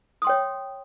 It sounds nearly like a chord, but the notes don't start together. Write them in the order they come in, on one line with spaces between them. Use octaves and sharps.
D#6 C6 G5 C#5